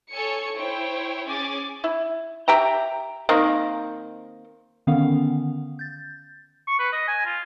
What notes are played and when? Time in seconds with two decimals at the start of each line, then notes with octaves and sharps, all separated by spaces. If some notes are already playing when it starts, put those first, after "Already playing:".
0.12 A4 C#5 G#5 C#7
0.55 E4 C5 C#5 G5
1.28 C#4 G#4 G#5 D6 A6
1.84 E4
2.48 G4 E5 G5 A#5
3.29 D#3 A#3 C4
4.87 D3 D#3 B3 C#4 F5
5.79 G6 A6
6.68 C#6
6.80 B4
6.93 D#5
7.08 G#5
7.26 F4